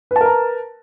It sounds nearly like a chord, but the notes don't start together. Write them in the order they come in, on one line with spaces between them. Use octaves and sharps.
B4 A5 A#4 A#5